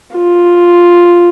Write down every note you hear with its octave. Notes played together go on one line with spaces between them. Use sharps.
F4